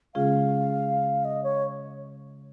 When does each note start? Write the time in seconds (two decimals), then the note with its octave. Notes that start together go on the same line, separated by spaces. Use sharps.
0.15 C#3 G#3 C#4 F4 G#4 F5
1.25 D#5
1.43 C#5